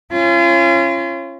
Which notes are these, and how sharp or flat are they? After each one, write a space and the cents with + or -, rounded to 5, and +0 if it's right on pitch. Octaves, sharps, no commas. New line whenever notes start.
C#4 -20 F4 -40